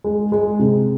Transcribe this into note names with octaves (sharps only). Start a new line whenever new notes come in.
G#3
G#3
C3